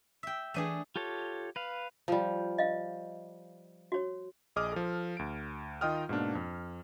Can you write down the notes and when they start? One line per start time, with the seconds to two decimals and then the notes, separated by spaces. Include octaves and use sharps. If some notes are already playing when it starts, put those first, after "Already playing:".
0.23 E5 G5
0.54 E3 A3 D4 G#4 D#7
0.96 F4 G4 A4 C#5
1.56 B4 F5
2.08 F3 G3
2.58 D#5 F5
3.92 F#4 C#5
4.56 A#1 G#4 D#5 D6 D#6 F6
4.72 F3 A4
5.17 D2 D7
5.81 D#3 F4 D#5 G5 D#6 F6
6.09 G#2 B2 A#3 D4
6.35 F2